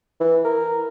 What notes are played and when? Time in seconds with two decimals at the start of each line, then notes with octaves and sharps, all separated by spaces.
0.20 E3
0.45 A#4